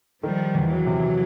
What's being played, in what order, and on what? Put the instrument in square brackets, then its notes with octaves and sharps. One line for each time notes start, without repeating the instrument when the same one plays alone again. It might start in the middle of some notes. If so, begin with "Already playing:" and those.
[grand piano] D#3 [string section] F3 G3
[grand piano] E2
[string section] E3 F#3
[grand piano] C3